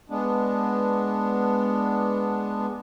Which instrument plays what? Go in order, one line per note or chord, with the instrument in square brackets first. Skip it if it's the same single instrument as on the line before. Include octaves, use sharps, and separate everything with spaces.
[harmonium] G#3 B3 D4